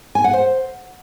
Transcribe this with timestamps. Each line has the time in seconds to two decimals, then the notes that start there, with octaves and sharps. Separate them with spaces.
0.15 G#5
0.24 F#5
0.33 C5